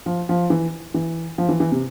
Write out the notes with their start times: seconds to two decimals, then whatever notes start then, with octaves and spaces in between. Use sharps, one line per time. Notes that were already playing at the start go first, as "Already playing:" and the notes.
0.06 F3
0.29 F3
0.50 E3
0.94 E3
1.38 F3
1.49 E3
1.60 E3
1.72 C3